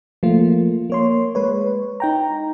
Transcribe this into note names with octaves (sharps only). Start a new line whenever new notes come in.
F3 A3 A#3 F4
A#3 C#5 C6
G#3 B4 C#5
D#4 G5 A#5